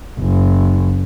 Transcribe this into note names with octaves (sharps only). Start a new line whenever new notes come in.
F#1